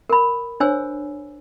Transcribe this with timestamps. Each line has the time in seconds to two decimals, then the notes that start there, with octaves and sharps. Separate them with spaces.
0.09 A#4 B5
0.60 D4 C5 C#5 G#5 E6